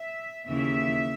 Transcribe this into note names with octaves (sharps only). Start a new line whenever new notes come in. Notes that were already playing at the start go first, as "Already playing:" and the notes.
Already playing: E5
D#2 C#3 E3 A#3 E5